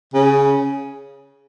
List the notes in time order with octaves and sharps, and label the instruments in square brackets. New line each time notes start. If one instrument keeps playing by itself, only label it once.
[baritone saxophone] C#3